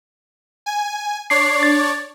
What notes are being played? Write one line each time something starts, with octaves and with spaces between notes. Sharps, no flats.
G#5
D4 C#5 D5 C7
A6